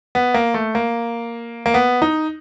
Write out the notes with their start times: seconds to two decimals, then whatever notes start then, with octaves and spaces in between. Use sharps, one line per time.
0.15 B3
0.34 A#3
0.54 A3
0.75 A#3
1.66 A#3
1.74 B3
2.02 D#4